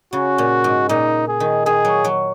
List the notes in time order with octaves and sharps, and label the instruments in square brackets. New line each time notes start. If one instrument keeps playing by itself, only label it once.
[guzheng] C#3 [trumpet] F#4
[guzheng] A#2
G#2
[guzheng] A#2 [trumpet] D#4
[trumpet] G#4
[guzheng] D#3
[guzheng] D#3 [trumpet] G#4
[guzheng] F#3
F#3